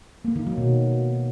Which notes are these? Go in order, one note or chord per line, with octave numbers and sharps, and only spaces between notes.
A#3
D#3
F#3
B2